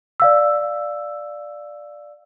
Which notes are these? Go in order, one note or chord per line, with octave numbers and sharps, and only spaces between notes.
D5 F5 E6